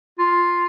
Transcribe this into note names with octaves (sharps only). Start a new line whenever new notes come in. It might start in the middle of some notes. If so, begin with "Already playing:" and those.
F4